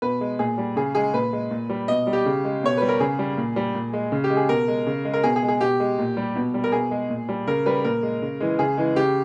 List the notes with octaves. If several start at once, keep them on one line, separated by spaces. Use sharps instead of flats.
B2 B4
G#3
A#2 G#4
G3
C#3 G#4
G#3 G#4
A#2 B4
G#3
A#2
G3
B2 D#5
G3
G4
C#3
G#3
B2 C#5
G3 B4
A#4
C#3 G#4
G3
A#2
G3
A#2
G#3
C#3
G4
G#3
G#4
B2 A#4
G#3
C#3
G#3
A#4
B2 G#4
G#4
G#3
G#4
B2 G4
G#3
A#2
G3
B2
G3
A#4
B2 G#4
G#3
A#2
G3
C#3 A#4
G3 B4
A#2 A#4
G#3
C#3
E3 G#3
C#3 G#4
E3 G#3
C#3 G4